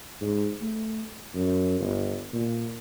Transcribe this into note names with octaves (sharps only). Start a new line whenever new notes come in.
G#2
A3
F#2
G1
A#2